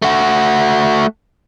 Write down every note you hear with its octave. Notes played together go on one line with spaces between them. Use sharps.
A3 F#4